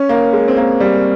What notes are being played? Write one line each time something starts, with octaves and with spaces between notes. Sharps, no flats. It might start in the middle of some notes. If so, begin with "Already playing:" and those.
Already playing: C#4
A#3
G#3
C4
A#3
G3